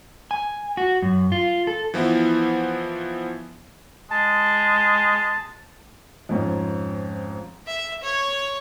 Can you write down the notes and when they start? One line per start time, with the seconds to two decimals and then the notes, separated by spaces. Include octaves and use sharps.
0.31 G#5
0.77 F#4
1.02 F#2
1.32 F4
1.67 A4
1.94 E3 F3 B3 E4
4.11 G#3 A5
6.29 F2 G#2 C#4
7.66 E5
8.03 C#5